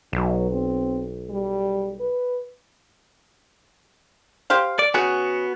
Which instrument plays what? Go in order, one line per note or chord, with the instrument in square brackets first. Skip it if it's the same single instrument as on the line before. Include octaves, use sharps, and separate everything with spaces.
[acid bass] B1 [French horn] F#3
[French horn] C4
G3
B4
[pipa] G4 C5 F5
[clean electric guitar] D5
[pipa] C#3 G#4 [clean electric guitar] B3 F#4